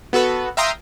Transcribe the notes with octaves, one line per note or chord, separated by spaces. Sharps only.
B3 F#4 A4 B4
E5 F5 G5 A#5 C6 D#6